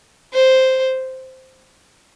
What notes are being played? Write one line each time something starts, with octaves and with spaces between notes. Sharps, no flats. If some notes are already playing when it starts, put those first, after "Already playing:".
C5